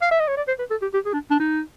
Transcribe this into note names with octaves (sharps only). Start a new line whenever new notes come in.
F5
E5
D#5
C#5
D5
C5
B4
A4
G4
G4
G#4
D4
D4
D#4